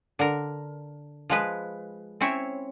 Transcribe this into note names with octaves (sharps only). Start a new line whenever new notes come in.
D3 A#4
F3 G#3 B4
C4 C#4 E4 C#5